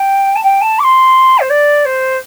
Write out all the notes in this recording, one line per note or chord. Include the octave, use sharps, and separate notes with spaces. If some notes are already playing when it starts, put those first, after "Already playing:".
Already playing: G5
A5
G5
A5
D6
C6
C5
D5
C5